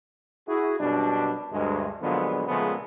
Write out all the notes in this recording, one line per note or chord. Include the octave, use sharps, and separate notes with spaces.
E4 F#4 G#4
F#2 B2 G3 D4
D2 G2 G#3
A#2 D3 F3 F#3 G#3 B3
A#2 C#3 F3 G#3 A3 B3